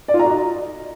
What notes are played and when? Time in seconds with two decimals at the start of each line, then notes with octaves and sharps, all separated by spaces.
0.08 D5
0.14 F4
0.19 A#5
0.25 F#4
0.30 D#5